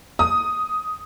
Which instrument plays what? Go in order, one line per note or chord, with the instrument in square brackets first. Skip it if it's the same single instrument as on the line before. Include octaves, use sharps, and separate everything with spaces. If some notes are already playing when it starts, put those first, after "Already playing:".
[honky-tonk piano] D#6